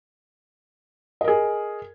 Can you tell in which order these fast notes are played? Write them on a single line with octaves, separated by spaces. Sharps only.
D#5 A#4 G#4